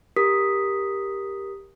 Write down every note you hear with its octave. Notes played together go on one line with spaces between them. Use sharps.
G4 A#4 D#6 B6